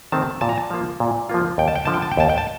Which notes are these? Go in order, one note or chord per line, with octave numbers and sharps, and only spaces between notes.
C3 D#3 A3 C4 A5
A#2 A5
A#5
A5
F3 A#3 F4
A#2
F3 A#3 F4
D#2 G5
A5
G5
D3 F3 A5
G5
A5
G5
D#2 A5
G5
A5